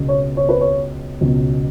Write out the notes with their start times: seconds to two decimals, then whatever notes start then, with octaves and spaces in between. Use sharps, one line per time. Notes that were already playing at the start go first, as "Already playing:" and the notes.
Already playing: C#2 B2 F#3
0.09 C#5
0.37 C#5
0.49 B4
0.61 C#5
1.21 C#2 B2 F#3